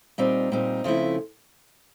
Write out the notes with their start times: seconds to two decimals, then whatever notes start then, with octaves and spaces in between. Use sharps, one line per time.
0.18 A#2 G3 C4 D#4
0.52 A#2 G3 C4 D#4
0.84 C#3 F3 A3 C4 E4